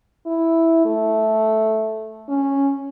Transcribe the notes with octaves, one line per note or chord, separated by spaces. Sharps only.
E4
A3
C#4